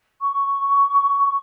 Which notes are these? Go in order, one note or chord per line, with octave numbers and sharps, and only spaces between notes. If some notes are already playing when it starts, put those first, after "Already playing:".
C#6